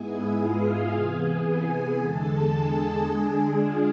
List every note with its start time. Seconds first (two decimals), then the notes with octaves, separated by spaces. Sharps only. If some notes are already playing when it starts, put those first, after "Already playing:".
Already playing: G#2 G#3 B3 E4 G#4 G#5
0.39 F4 F5
0.92 C3 E3 B3 G#4 G#5
1.46 G#4 G#5
1.99 E2 D3 G#3 A4 A5
2.53 G#4 G#5
3.07 D3 G#3 D4
3.61 F4 F5